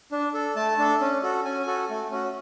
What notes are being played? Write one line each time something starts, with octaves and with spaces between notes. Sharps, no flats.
D4
A4
A3 A5
D4 A4
C#4
F#4 A4
C#4 G#5
F#4 A4
A3
C#4 F#4